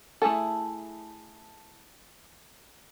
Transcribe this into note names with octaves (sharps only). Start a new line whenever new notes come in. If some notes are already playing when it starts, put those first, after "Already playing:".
A3 E4 G#4 A4